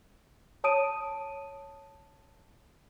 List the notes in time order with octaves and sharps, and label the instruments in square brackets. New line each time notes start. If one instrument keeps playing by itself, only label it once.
[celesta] C#5 A5 D#6 D7 D#7